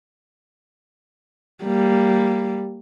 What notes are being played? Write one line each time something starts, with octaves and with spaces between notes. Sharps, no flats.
G3 A#3